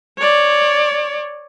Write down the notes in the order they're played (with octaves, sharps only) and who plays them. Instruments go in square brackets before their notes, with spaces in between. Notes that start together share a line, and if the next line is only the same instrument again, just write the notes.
[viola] C#5 D5